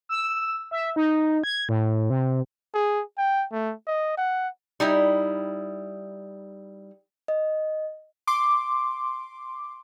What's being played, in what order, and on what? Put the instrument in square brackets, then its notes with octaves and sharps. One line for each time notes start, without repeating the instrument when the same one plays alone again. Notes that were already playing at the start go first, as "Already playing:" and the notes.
[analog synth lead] E6
E5
D#4
G#6
A2
C3
[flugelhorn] G#4
G5
A3
D#5
F#5
[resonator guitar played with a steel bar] G3 D#4 E4
[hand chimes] D#5
[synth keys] C6 D6